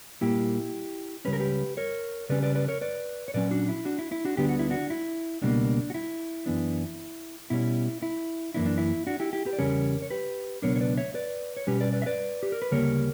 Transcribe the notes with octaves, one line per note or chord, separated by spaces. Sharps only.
A#2 G3 A#3 E4 G4
C#2 C#3 G3 C#4 B4
A#4
G4 B4
A#4 C#5
C#3 G3 C#4 B4 D5
B4 D5
B4 D5
A#4 C#5
B4 D5
C#5
A#2 F#3 C#4 B4 D5
D4 F#4
E4
D4 F#4
E4
E4
D4 F#4
D2 D3 G3 B3 D4 G4
F#4
E4
D4 F#4
E4
C#2 B2 G3 A#3 D4
F#4
E4
F#2 E3 B3 D4
B2 G3 C#4 E4
E4
F#2 E3 A#3 D4 E4
D4
E4
D4 F#4
E4 G4
E4 G4
G4 B4
D5
E2 C#3 G3 C#4 A#4 C#5
C#5
G4 B4
C#2 B2 F#3 B3 D4 A#4 C#5
C#5
B4 D5
C#5 E5
B4 D5
C#5
B2 G3 C#4 G4 B4
B4 D5
B4 D5
E5
B4 D5
G4
A#4
B4
D2 C#3 G3 A#3 A#4 C#5